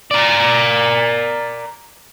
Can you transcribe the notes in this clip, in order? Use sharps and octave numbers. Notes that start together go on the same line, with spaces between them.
A#4 D5